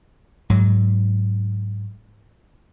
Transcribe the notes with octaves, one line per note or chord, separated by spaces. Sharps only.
G#2 F#3